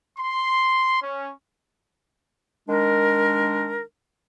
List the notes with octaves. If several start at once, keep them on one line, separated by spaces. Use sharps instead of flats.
C6
C#4
D#3 G#3 D4 A#4